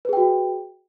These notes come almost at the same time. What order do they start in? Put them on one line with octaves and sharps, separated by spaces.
B4 G#4 G5 F#4